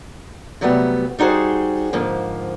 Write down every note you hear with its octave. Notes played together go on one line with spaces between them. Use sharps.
C3 F#3 G3 A3 B3
G3 D#4 F#4 G#4 C5
G#2 D3 F3 A#3